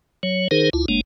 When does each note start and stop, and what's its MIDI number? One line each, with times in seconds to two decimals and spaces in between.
0.23 0.48 54
0.23 0.48 73
0.51 0.70 51
0.51 0.70 63
0.51 0.70 68
0.51 0.70 70
0.51 0.70 72
0.73 0.86 38
0.73 0.86 64
0.73 0.86 65
0.88 1.01 30
0.88 1.01 56
0.88 1.01 58
0.88 1.01 62